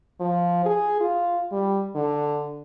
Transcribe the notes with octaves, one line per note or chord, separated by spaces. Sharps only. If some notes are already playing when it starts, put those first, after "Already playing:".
F3
G#4
F4
G3
D3